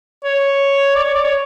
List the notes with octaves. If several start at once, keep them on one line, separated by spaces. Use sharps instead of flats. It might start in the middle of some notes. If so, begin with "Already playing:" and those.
C#5
D5
C#5
D5
C#5